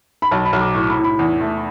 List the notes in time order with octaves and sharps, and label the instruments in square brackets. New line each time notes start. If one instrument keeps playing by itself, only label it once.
[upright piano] B5
[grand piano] B1 [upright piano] A5
[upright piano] B5
[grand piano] B1
[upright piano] D6
[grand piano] A2 [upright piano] C#6
[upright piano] B5
[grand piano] A2
[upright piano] B5
[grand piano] E2
A3